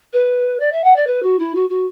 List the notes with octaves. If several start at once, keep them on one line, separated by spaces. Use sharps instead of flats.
B4
D5
E5
F#5
D5
B4
F#4
E4
F#4
F#4